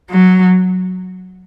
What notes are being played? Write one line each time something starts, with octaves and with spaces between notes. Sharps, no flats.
F#3